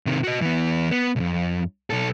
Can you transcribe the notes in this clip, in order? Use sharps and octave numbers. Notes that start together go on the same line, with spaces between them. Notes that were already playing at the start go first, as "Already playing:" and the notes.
C3 D#3
F#4 D#5
E3 B3
B3
C2 F2
B1 A4